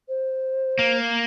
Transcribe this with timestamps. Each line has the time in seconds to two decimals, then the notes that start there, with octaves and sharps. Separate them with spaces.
0.09 C5
0.79 A#3